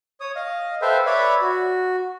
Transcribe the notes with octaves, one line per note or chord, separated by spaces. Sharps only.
C#5 D#6
D#5 F5
A4 B4 C5 E5 F5 G5
B4 C#5 D5 E5 B5
F#4